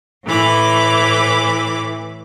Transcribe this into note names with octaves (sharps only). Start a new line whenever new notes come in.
A2 E3 B5 D6